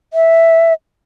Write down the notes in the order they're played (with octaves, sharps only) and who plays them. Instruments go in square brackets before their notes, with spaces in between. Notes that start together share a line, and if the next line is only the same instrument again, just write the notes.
[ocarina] E5